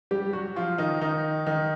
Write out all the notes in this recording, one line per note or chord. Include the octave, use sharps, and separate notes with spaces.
G3 G4
F#3 F#4
F3 F4
D#3 D#4
D#3 D#4
D#3 D#4